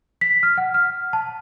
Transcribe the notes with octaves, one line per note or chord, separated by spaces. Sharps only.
B6
F6
F#5
F6
A5